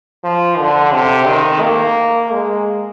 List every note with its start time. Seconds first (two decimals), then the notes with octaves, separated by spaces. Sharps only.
0.24 F3
0.59 D3
0.93 C3
1.28 D#3
1.62 A#3
2.32 G#3